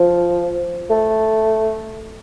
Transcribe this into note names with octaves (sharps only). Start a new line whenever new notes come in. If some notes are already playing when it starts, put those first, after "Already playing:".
Already playing: F3
A3